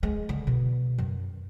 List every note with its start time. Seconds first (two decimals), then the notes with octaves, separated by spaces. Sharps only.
0.03 G#3
0.29 D3
0.47 B2
0.98 F#2